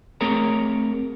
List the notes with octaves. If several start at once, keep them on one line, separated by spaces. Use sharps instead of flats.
A3 C4 G#4 A#4 C#5 A#5